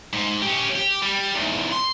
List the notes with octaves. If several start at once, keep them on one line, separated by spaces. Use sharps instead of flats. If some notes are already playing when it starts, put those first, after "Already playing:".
G#2
C#4 G4
G4
G3
E2 G#2
C6